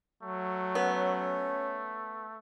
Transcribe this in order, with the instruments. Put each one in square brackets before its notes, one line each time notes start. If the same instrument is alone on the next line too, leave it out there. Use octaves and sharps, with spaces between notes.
[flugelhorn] F#3 [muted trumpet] A3
[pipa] B3 [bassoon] C#4